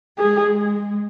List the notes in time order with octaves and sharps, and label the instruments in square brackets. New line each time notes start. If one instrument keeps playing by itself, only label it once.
[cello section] G#3 [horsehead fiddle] G#4